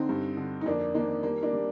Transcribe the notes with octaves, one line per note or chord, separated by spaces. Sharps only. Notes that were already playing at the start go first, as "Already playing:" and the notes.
Already playing: D3 C4 D#4
G2
D3
D#4
F2 A#3 D4
D#3 A#3 D4
G3 A#3
A#3 D4
G3